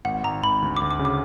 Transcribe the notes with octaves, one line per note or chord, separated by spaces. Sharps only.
G#1 F#5
G#1 A#5
G#1 B5
D2
D2 D6
D6
C#3
D6